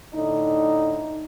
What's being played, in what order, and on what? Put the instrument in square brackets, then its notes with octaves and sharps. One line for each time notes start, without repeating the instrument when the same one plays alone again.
[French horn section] A2 D3 D#4